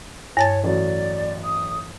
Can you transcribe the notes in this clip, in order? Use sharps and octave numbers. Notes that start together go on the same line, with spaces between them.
G2 C#5 A5 A6
A1 F#3 D5
D#6